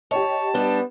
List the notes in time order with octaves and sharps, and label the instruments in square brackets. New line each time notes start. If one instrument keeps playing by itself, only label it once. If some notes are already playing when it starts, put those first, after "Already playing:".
[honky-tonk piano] G4 D#5 [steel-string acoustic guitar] C#5 [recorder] A5
[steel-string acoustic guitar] G3 D4 [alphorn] B3